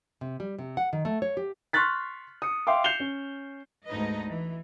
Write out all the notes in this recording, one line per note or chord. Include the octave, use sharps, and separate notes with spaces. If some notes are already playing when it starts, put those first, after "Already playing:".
C3
G3
C3
F#5
D#3
A3
C#5
G4
C6 C#6 F6 F#6 A6 B6
D#6 C#7
E5 F5 G5 C6 D6
G6 C7 C#7 E7 F7 G7
C#4
D2 G#2 D#4 B4 D#5
E3